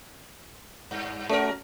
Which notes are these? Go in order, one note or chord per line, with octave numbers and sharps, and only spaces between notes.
G2
A3 C#4 F#4 A#4